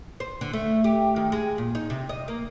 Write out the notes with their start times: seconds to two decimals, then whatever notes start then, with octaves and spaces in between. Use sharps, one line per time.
0.20 C5
0.41 D3
0.53 A3
0.84 G4
1.16 D#3
1.32 G#3
1.58 A#2
1.75 D#4
1.90 C3
2.09 D#5
2.28 A#3